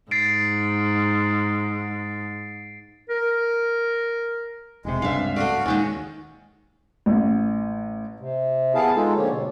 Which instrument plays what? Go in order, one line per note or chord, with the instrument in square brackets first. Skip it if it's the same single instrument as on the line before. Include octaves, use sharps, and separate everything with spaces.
[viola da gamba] G#2 [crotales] A6 C7 D7
[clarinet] A#4
[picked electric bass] E1 C3 [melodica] G#3
[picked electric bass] C#2 G2 C3 [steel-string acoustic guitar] E5 F5
[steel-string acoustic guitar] A3 D5 [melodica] F#4 F5
[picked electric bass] D#2 [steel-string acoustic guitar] A#2 D#3 G#3 [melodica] C#4 F#4
[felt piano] A1
[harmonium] C3
B3 E4 G#4 F5 A5
G#3 D#4 F4 A4
D3 F3 A#3 G4 C#5
G#2 B2